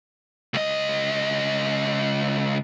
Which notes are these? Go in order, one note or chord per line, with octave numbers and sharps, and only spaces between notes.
C#2 D#5